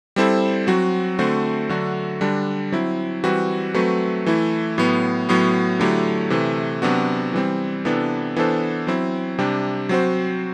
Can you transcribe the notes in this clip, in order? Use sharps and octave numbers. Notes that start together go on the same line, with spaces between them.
G3 C4 E4 A4 C5
F#3 C4 F#4
D3 A3 C4 F#4 C5
D3 F#3 A3 D4 F#4
D3 G3 D4
F#3 C4 E4
E3 G3 C4 F#4 B4
F#3 A3 C4 F#4 B4
E3 A3 E4
A2 F#3 B3
A2 F#3 B3 F#4
D3 F#3 A3 E4 G4
C3 E3 A3
C3 F#3 B3 D4 F#4
E3 G3 C4
C3 E3 B3 D4 A4
E3 B3 D4 A4 C5
F#3 C4 E4
C3 G3 D4 G4
F#3 C4 F#4 C5